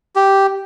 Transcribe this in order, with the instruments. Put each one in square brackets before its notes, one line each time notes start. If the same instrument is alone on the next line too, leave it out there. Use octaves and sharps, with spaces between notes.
[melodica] G4